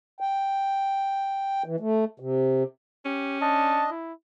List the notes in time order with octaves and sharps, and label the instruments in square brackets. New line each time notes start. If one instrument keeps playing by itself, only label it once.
[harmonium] G5
E3
A3
C3
[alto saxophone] C#4 [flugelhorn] G4
[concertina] D4 D#5 [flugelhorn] A5
[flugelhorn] E4